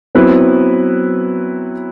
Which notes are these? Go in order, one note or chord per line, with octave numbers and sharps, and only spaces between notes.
F#3 B3 C4 E4 B4